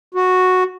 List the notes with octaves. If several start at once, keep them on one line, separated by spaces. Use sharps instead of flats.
F#4